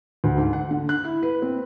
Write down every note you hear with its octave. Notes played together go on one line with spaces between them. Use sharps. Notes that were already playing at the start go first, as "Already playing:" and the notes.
D2
G#2
F#5
D3
F#6
E4
B4
C4